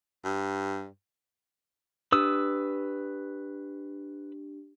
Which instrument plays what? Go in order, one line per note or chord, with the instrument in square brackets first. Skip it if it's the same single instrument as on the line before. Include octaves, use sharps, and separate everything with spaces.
[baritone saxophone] G2
[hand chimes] D4 G4 [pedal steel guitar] B4 D#6 E6